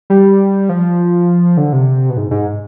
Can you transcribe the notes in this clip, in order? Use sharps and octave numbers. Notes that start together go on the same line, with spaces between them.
G3
F3
D3
C3
B2
G#2
G#2